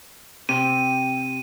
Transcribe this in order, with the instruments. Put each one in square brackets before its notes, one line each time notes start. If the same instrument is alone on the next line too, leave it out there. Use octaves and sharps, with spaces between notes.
[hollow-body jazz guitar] C3 [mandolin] C4 D4 G4 [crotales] D#7